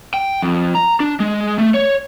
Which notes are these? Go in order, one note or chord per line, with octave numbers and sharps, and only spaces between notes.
G5
F2
A#5
D4
G#3
A3
C#5